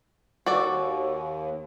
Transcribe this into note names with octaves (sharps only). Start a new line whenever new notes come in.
D#2 F#4 A4 D5